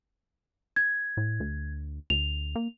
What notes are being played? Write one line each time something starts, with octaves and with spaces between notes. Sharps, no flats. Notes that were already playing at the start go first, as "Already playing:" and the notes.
G#6
A2
D2
D2 F7
A#3